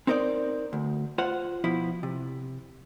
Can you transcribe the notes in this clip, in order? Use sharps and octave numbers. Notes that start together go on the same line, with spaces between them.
C4 D#4 A#4 C5 D5
D2
F4 C5 F#5
B2 F3 E4
C3